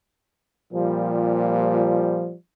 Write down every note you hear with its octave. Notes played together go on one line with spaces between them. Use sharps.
A#2 F3 G3